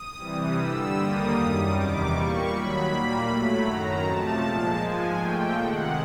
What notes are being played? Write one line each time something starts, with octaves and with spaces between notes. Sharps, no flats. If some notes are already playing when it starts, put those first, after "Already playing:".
Already playing: D#6
C3 E3 G3
G2 D3 G3 E6
D#2 D3 G3 A#3 D#6
F#2 D#3 G3
E2 C3 D#3 G3 D6
A#2 G3 A#3 C#6
D#2 D#3 F#3 B5
A#2 G3 A#3
A2 F#3 A3
F#2 D#3 F#3 A#5
C3 F3 A3 A5
A#2 F3 G#3 A5
G#2 F3 G#3 G#5
A#2 F3 A3 G5
C3 D#3 G#3 F#5